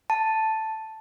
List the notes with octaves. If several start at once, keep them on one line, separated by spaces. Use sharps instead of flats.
A5